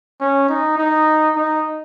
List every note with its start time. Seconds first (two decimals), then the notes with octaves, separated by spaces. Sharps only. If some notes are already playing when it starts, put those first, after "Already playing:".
0.21 C#4
0.49 D#4
0.78 D#4
1.36 D#4